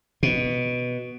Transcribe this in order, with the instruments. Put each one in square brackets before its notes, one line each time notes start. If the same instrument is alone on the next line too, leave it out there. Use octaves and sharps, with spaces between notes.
[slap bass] B2